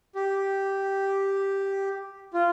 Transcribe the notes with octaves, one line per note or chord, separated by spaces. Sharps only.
G4
F4